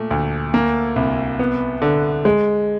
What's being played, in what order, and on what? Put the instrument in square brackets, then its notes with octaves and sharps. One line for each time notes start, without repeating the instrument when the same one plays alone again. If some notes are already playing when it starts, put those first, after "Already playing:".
Already playing: [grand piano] A#2 A3
D2
A#3
C2
B3
D3
G#3